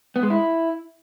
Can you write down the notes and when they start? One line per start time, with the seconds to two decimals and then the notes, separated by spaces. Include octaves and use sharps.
0.16 B3
0.23 G#3
0.30 E4